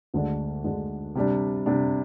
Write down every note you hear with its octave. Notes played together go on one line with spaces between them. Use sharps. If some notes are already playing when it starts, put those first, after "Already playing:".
D2 D3 G#3 D4
D2 D3 G#3 D4
C3 G3 D4
C3 G3 D4